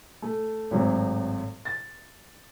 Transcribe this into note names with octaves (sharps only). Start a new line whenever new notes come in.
A3
G#1 A2 F#3 C4
A6